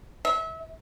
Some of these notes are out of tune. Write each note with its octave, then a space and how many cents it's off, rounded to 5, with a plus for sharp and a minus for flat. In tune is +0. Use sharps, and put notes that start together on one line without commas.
E5 -30